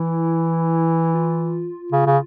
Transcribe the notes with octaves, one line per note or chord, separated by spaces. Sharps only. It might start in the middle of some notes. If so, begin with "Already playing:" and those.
Already playing: E3 E4
F4
C#3
C#3